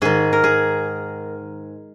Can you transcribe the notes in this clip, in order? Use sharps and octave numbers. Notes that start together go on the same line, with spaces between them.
G#2 D#3 G#4
A#4
G#4